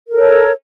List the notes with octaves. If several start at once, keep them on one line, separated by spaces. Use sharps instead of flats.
A4 A#4 C#5